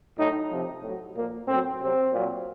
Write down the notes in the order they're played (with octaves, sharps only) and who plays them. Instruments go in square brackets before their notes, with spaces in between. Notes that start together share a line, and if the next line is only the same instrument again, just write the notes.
[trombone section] A2 F#3 D#4
C3 F3
A2 F#3
A#2 F3 A#3
A2 F#3 C4
C3 F#3 C4
A#2 F#3